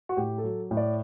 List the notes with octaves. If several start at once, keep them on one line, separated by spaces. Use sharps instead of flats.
F#4
A2 G4
A4
F#3
A2
D5